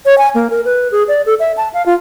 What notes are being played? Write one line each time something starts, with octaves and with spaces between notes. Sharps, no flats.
C#5
G#5
A#3
A#4
B4
G#4
D5
A4
E5
A5
F5
F4